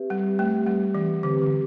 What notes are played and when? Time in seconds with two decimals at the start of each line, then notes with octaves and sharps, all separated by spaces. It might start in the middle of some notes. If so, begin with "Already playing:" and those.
Already playing: C4 G4 B4 E5
0.10 G3
0.39 A3 C4 G4 B4 E5
0.67 G3
0.95 E3
1.23 D3 C4 G4 B4
1.42 D3